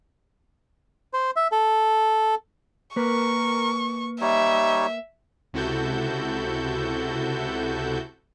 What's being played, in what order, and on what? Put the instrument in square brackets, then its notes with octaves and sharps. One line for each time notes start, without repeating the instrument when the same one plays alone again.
[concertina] C5
E5
A4
[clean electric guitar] A#3 B4 [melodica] A#4 [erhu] C#6
[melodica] G3 D#4 C#5 [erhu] E5
[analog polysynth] C#2 C3 E4 F#4 A4 G6